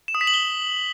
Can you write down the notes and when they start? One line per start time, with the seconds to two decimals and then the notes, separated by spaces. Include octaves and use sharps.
0.08 E7
0.15 D#6
0.21 B6
0.27 F#7
0.34 G7